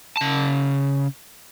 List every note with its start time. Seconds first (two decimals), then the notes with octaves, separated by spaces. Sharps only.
0.17 C#3 A5